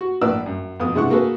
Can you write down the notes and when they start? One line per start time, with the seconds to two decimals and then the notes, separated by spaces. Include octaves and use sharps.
0.01 F#4
0.21 A#1 A2 A#3 B4 D5 E6
0.46 F#2
0.80 F2 B2 B3 D#6
0.95 C3 G#3 D4 E4 F#5 C#6
1.10 A#3 F#4 G#4 A4 B4